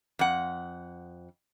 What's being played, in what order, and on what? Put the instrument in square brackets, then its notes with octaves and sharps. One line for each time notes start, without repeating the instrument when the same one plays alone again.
[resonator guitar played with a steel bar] F2 F#5